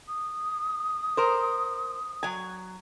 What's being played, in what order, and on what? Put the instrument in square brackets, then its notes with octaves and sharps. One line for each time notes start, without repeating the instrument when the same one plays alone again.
[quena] D#6
[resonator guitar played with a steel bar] A#4 C5
F#3 G#5